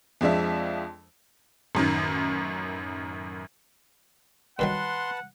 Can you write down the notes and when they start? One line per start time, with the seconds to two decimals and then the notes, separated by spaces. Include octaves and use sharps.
0.21 F2 F3 G#3 D4 E5
1.75 A1 F#2 D#3
4.59 G2 D#3 F#3 B4 F#5 A5 C6